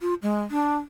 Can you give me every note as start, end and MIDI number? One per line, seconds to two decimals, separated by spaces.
0.01 0.14 65
0.23 0.41 56
0.51 0.74 62